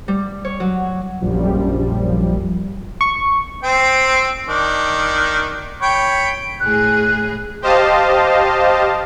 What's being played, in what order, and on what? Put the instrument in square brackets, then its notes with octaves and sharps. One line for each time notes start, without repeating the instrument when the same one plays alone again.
[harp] G3
C#5
F#3
[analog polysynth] A#1 F#2 F3 G3
[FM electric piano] C#6
[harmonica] C4 G5
D#3 D4
C#5 G5 B5
[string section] A2 G#4 [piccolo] F#6
[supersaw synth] G4 C5 D#5 F5 A5